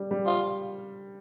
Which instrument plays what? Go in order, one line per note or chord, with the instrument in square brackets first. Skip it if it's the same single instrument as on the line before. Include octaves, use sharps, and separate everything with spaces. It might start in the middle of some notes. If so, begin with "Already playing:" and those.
Already playing: [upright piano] G3
G3
[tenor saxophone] F4